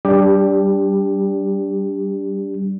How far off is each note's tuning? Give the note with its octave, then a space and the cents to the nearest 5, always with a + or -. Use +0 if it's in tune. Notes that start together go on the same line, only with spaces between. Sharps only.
G3 -20 D4 -15 G4 +15